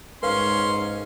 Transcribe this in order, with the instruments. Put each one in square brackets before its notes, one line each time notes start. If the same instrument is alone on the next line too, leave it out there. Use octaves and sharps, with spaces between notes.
[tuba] G#2 [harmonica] C#4 C6 [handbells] A#4 F5 [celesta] B4 F6